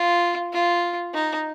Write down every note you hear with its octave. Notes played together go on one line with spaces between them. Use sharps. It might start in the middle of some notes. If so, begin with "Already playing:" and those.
Already playing: F4
F4
D#4